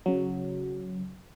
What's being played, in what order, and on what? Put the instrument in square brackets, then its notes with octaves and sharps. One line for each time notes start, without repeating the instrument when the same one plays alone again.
[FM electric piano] C#3 F#3